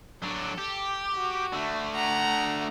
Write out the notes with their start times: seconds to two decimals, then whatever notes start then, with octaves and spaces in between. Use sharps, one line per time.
0.22 F#3 D4 A4
0.58 G4
1.15 F#4
1.53 D3 A3
1.95 F#5 A#5